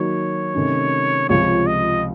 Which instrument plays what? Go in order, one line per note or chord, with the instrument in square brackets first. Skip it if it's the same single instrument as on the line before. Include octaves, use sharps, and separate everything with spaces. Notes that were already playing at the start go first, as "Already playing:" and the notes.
Already playing: [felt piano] D#3 F#3 A#3 D#4 F#4 [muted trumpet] C#5
[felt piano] C3 D#3 A3 C#4
[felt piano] C#2 C3 F3 [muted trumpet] C#5
[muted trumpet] D#5